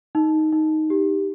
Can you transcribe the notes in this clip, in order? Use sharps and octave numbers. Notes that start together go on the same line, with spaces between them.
D#4
D#4
G4